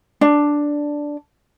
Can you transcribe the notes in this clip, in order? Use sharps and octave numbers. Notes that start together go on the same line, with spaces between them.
D4